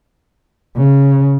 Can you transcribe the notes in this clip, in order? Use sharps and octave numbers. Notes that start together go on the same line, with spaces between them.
C#3